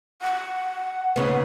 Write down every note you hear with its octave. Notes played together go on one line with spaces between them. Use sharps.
F#5
D#2 C#3 B3